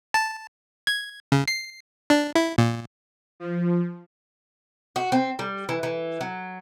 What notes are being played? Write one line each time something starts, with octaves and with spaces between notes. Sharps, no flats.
A5
G#6
C#3
C7
D4
E4
A#2
F3
F#4
C4
G3
E3
E3
F#3